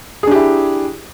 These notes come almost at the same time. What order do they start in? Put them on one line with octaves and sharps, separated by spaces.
G#4 D4 G4 E4